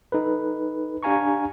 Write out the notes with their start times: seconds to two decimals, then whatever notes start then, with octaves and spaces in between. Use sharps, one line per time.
0.12 D#4 A4 B4
1.03 D4 G4 F5 G#5 A#5 C#6